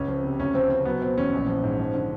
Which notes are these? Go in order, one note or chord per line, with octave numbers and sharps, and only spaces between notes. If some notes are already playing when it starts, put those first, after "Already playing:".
Already playing: C#2 C#4
F3
C3
D2 C#4
F3 C4
C#3 C4
F#3 B3
B2 C4
E2 C#4
A#1
F3
G#2
F3
D3